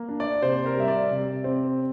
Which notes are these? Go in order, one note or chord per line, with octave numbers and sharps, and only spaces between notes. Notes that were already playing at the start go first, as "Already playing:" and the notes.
Already playing: A#3
D4
D5
C3 C5
A#4
G3 E5
D5
C3
C4